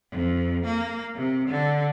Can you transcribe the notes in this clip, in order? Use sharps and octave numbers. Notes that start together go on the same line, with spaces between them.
F2
A#3
C3
D3